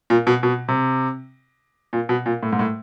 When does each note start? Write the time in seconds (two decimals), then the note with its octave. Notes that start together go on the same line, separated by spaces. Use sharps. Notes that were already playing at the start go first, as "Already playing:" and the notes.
0.10 A#2
0.27 B2
0.43 B2
0.68 C3
1.93 A#2
2.09 B2
2.26 A#2
2.43 A2
2.53 G#2
2.59 A2